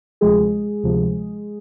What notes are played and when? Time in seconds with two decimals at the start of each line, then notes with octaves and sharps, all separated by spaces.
0.21 D2 C3 F3 G#3 G#4
0.83 D2 C3 F3